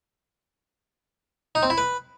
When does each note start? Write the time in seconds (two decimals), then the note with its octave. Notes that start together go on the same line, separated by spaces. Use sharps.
1.55 D#4
1.63 C4
1.70 E4
1.78 B4